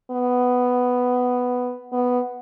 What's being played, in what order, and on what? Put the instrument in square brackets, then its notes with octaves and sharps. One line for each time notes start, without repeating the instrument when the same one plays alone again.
[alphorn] B3
B3